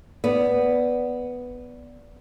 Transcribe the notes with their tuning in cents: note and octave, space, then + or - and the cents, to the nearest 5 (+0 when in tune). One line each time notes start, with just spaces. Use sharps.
B3 +0 D5 -10